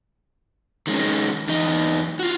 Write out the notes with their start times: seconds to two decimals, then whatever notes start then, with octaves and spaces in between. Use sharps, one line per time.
0.87 D#3 G#3 C#4
1.47 E2 D#4 D#5
2.19 F4 F#4